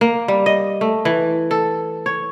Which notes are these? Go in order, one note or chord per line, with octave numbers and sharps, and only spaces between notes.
A#3
G3
D#5
A3
E3
A4
C#5